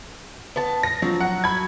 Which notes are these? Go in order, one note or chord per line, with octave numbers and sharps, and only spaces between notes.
B3 A5
A#6
F3 F#3
F#5
B5 G#6